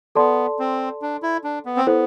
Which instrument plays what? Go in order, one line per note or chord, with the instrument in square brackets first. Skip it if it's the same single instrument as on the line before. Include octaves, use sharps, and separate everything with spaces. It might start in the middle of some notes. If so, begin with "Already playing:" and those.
[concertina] B3 [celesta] A4 D5 A5 C6
[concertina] C4
D4
E4
D4
B3
C4
[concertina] B3 [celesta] E4 A4 C5